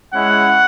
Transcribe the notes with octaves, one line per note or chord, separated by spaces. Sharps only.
G#3 C#4 E4 F#5